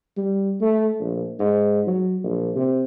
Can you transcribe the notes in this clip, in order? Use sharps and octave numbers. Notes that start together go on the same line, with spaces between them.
G3
A3
A#1
G#2
F#3
A#1
C3